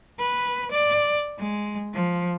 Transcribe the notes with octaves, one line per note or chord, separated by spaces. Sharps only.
B4
D5
G#3
F3